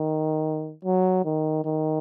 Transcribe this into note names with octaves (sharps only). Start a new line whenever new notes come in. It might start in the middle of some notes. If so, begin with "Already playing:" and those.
Already playing: D#3
F#3
D#3
D#3